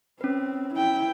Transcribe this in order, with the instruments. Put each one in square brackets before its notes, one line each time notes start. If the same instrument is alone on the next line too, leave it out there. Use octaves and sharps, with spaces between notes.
[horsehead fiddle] C4 [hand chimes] C#4 B4
[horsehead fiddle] E4 G5